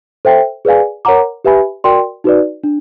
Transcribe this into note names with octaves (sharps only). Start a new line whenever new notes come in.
A4 C5 E5 G5
G#4 B4 D5 F5 G#5
A#4 C#5 F#5 A#5 D6
G4 B4 E5 G#5 B5
F#4 A#4 D5 G5 C6
D#4 F#4 B4 D5
D4